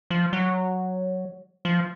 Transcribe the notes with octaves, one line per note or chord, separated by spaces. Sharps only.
F3
F#3
F3